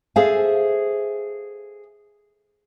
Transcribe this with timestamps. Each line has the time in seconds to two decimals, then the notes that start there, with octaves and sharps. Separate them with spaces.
0.16 G#4 A4 C5 E5 F5 G#5